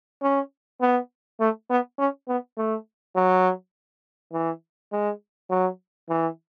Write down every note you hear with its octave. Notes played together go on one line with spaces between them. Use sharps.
C#4
B3
A3
B3
C#4
B3
A3
F#3
E3
G#3
F#3
E3